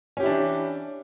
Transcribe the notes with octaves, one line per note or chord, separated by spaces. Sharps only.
E3 C#4 D4 E4 G4